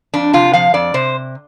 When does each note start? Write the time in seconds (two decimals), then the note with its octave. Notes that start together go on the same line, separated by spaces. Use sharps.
0.14 F2 D4
0.33 C3 F4
0.53 F3 F5
0.74 F2 D5
0.94 C3 C5